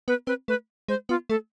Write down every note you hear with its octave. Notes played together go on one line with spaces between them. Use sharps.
B3 B4
C4 B4
A3 B4
G#3 C5
B3 F4
A3 A4